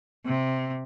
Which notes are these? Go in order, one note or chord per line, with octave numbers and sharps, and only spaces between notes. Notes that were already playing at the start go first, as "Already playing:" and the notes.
C3